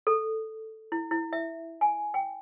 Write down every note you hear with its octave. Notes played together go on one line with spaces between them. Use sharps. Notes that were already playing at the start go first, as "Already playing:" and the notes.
A4
E4
E4
E5
G#5
G5